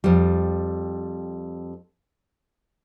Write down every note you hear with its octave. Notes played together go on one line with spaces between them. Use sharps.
F2 G3